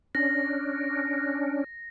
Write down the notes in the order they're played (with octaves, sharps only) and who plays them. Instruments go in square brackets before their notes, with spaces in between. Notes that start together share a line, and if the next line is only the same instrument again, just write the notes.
[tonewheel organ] C#4 D4 [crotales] A#6